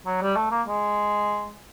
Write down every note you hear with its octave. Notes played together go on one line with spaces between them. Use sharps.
F#3
G3
A3
A#3
G#3